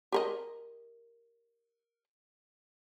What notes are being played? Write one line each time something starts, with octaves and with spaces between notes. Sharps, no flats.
G4 A#4 D#5